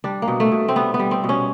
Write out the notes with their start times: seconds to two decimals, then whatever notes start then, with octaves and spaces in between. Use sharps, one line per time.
0.04 G3 D4
0.22 A#3
0.28 B2
0.40 A3
0.52 B2
0.68 C4
0.76 G3 B3
0.94 B3
0.99 G3
1.11 C4
1.24 B2
1.29 C#4